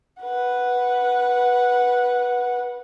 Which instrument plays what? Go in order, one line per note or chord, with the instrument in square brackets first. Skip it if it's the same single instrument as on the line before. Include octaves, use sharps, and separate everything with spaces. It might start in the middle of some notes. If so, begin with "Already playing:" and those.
[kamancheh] B4 F#5